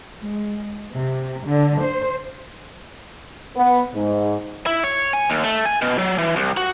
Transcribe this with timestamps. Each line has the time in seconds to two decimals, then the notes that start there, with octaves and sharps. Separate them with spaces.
0.21 G#3
0.93 C3
1.45 D3
1.83 C5
3.56 B3
3.94 G#2
4.66 E4
4.84 C#5
5.13 G#5
5.30 D#2
5.44 A3
5.66 G#5
5.82 B2
5.98 F#3
6.18 E3
6.36 C2
6.57 F#4